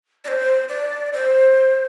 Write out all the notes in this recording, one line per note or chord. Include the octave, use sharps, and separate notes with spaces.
D5
C5
D5
C5